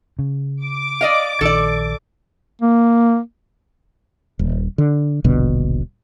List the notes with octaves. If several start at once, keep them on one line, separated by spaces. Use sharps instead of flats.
C#3
D6
D5 D#5 F5
A#1 D#3 A4 D5
A#3
D#1
D3
D#1 A#1 B2 D3